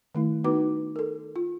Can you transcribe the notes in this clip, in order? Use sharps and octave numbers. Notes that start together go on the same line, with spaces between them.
D#3 A3 E4
B3 D#4 F#4 B4 D6
A4 A#4
F4